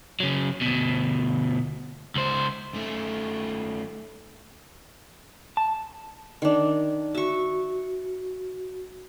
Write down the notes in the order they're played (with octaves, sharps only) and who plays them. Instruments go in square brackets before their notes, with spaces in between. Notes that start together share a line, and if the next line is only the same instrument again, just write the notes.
[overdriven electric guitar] C#3 F#3
D2 B2
C#2 C5
F#2 A3
[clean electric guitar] A5
[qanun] D#3 D4
[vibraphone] F#4 [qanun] E5 C#6